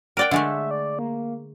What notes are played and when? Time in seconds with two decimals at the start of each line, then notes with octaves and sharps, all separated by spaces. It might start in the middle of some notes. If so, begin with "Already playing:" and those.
0.17 A#4 D5 F#5 G5
0.31 D3 G#3 A3 E5
0.71 D5
0.99 A#3